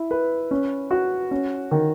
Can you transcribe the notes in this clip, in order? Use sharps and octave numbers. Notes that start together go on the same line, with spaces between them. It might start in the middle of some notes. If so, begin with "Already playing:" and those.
Already playing: E4
B4
C#4
F#4
C#4
D#3